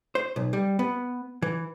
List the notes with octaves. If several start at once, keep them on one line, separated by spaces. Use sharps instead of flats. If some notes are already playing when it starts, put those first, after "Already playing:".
C5
B1
G3
B3
E3